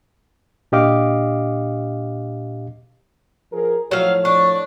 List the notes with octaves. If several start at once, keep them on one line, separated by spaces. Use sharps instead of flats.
A#2 D4 G4 D#5 F5 D6
F3 G#4 A#4
A2 F3 F#3 C#5 F5
D4 C#6